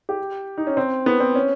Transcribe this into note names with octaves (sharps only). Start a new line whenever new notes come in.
G4
D#4
C#4
C4
B3
C4
C#4